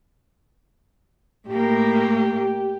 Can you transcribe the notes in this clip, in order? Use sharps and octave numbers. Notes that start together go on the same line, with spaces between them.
A2 A#3 G4